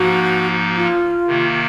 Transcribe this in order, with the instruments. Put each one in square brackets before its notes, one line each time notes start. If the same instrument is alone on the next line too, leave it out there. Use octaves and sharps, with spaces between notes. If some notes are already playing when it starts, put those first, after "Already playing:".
Already playing: [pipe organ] G#2 F3 A#3 D#4 [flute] F#4
[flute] F4
[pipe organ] C3 D#3 A#3